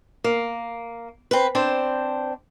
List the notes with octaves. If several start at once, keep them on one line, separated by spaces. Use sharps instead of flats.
A#3
C4 B4
C4 D4 C5